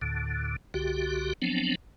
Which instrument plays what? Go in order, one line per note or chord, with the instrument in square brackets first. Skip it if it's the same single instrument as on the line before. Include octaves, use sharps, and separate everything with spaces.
[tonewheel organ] D2 A2 D3
C2 D3 F#4 G4
F3 F#3 B3 C4 D4